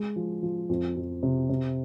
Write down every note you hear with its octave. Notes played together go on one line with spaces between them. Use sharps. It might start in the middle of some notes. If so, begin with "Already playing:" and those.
Already playing: G#3
F3
F3
F2
F2
C3
C3